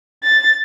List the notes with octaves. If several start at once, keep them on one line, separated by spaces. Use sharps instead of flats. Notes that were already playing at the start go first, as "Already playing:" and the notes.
A6